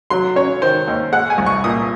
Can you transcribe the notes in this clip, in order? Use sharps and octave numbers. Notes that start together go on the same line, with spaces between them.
F#3 C6
C#4 C#5
D#3 C5
D#2
G#3 F#5
G#5
C2
C#6
A#2 D#6